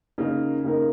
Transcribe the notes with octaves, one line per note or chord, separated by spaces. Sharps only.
C#3 A#3 D#4 A#4
C#3 A#3 D#4 A#4